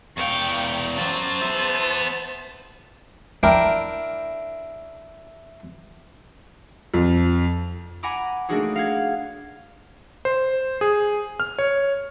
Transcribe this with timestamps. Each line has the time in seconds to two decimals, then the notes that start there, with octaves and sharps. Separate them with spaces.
0.17 E2 F5 G5 C#6
0.96 F#3 C#4 C5 A5
1.42 B3 E5
3.43 D4 E4 A#4 G5
6.94 F2
8.03 F#5 G#5 A#5 B5 D6
8.49 A3 A#3 D4 D#4 F#4 G#4
8.76 F5 F#5 G#6
10.25 C5
10.81 G#4
11.40 F6
11.59 C#5